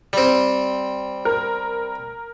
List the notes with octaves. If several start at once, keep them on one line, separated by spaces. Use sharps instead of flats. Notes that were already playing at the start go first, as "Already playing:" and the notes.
G3 C4
A#4